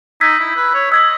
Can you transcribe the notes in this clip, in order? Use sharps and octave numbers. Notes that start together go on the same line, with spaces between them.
D#4 E6 G#6 B6
E4
B4
C#5
D#5 E6 G#6 B6